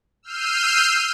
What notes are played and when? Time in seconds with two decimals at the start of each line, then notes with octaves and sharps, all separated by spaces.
0.23 E6 F6 G6 C7 D#7